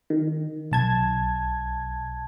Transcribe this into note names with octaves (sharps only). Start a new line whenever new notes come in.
D#3
B1 A5 G#6